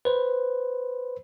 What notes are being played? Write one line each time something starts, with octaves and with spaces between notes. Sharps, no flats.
B4 C5